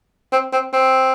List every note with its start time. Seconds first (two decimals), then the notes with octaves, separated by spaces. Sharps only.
0.32 C4
0.53 C4
0.73 C4